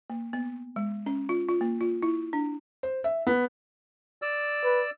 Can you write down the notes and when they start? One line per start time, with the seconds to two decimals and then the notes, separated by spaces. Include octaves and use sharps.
0.10 A#3
0.33 B3
0.76 G#3
1.06 C#4
1.29 F4
1.49 F4
1.61 A#3
1.81 F4
2.02 E4
2.33 D4
2.83 C5
3.04 E5
3.27 B3
4.22 D5 E6
4.64 B4